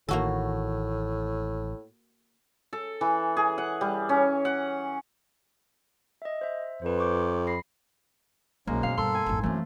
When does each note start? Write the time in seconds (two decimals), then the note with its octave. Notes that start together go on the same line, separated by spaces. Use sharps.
0.09 A1 A2 D#3 A#3 F#4 A4
2.73 A4
3.01 E3
3.37 G#4
3.58 F#5
3.81 G3
4.09 C#4
4.45 F#5
6.22 D#5 E5
6.41 C5 E5
6.82 F2 B4 C5
6.99 C#6 D6 G6
7.47 B5 A#6 C7
8.67 B1 F#2 G#3 A#3
8.83 B2 F5
8.98 G2 B2 A4 C6
9.14 G#5
9.26 G#1 E2
9.43 F#2 E3 A3 C4